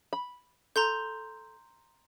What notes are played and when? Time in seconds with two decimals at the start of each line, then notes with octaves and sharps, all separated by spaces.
0.13 B5
0.76 A4 A#5 C6 G6